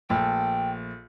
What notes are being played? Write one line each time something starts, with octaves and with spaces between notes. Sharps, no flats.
A#1 A3 G5